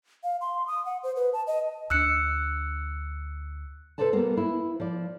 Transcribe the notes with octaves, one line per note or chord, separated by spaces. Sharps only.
F5
C6
D#6
F#5
C5
B4
A5
D#5
D2 D4 E6 F#6 C#7
C3 A4 B4 C5 D5 A5
G3 A#3 B3
E4
F3 D5